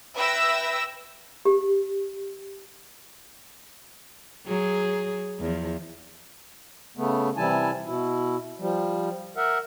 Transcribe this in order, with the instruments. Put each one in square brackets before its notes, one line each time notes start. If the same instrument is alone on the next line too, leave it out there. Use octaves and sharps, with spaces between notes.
[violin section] B4 E5 G5 E6 A#6
[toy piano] G4
[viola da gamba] F#3 G#4
E2 F3
[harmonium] C#3 A3 B3
C3 E3 G3 E4 G#5 A5
B2 E4
F3 G3
A#4 E5 F#5